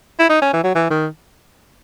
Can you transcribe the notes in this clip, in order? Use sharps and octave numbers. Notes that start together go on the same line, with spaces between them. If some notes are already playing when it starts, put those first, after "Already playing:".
E4
D#4
C#4
E3
F#3
E3
D#3